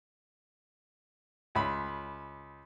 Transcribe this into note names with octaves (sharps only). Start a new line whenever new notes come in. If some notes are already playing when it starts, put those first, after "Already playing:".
C#2 B5